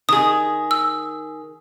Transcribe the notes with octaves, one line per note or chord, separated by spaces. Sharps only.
D#3 G#4 D#6
E6